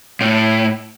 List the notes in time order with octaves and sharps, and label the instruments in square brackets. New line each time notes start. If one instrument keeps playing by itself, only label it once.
[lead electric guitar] A2